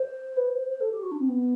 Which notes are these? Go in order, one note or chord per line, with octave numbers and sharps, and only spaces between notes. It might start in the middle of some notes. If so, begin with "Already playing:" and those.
Already playing: C5
B4
C5
C5
C5
A4
G4
F#4
D4
C4
B3